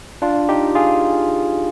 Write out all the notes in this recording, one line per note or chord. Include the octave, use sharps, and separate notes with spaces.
D4 F4
D#4 G4
F4 G#4